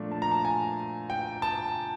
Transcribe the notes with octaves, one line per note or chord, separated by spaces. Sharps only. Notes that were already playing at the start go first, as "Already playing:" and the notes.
Already playing: A#2 F3 A3 D4
A5
A#5
A5
G#5
G5
A5